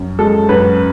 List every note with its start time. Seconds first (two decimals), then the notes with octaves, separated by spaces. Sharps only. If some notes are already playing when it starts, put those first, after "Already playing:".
Already playing: F#2
0.19 G#3 A4
0.49 F#2 B4